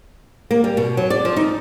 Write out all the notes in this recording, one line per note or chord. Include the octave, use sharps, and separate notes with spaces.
A#3
G3
B2
F#3
D5
F3
D#4